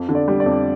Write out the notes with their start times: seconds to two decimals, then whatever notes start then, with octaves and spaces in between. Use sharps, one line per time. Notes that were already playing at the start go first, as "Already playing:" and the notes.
Already playing: F2
0.09 D3
0.15 D5
0.28 G3
0.40 D5
0.46 F2